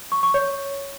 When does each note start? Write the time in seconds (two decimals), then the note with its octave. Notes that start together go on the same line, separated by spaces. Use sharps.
0.12 C#6
0.23 C#6
0.34 C#5